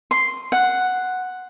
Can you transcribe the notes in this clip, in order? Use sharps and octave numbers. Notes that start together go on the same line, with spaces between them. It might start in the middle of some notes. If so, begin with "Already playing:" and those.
C6
F#5